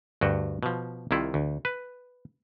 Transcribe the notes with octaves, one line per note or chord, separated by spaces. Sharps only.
D2 G2 F#4 G5
B2 F3
C2 C3 D#3 E4 F4
D2
B4